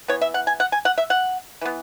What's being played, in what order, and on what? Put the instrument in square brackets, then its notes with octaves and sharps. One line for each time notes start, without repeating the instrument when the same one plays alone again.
[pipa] E3 B3 C#5
E5
F#5
G#5
F#5
G#5
F#5
E5
F#5
E3 B3